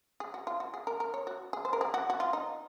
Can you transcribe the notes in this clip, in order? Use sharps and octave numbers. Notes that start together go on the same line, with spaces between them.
G#4
F#4
F4
F#4
G#4
A#4
A#4
C#5
F#4
G#4
C5
A#4
G#4
F#4
F#4
F4
D#4